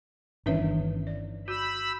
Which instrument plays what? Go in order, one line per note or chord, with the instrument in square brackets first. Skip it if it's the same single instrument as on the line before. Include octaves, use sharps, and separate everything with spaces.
[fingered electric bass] G1 C#4 [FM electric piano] D#3 E3 [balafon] D4 B4 E5
[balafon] D5
[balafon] F#4 [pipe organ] B5 E6 [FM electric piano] G6